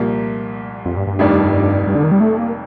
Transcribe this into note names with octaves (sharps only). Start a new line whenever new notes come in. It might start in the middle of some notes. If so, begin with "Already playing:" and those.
Already playing: C2 A#2 F3 A#3
F2
G2
G2
F1 F2 D#3 G3 D4
G2
D3
D#3
G3
A3
A#3